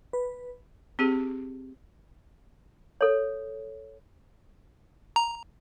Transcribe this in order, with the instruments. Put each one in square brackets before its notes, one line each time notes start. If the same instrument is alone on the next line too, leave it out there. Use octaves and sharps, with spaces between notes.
[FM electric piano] B4
[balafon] C4 G4 G#4
[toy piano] A4 C#5
[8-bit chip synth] A#5